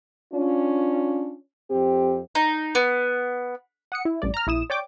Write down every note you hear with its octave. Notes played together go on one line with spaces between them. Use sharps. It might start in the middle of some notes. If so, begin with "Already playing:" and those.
C#4 D4 F4
F2 C4 G4
D#4
B3
F#5 D#6 C#7
E4
A1 G2 D5
A#5 F6
A#1 E4 D#6 E7
C#5 D5 G5 D6